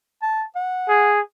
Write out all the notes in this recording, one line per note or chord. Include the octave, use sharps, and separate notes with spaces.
A5
F#5
G#4